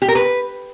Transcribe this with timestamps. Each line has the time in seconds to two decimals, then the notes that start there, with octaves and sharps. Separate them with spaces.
0.02 G4
0.08 A#4
0.15 B4